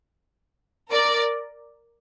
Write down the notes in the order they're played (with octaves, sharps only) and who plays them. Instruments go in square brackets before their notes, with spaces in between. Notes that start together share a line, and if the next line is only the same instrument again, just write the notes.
[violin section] A#4 D5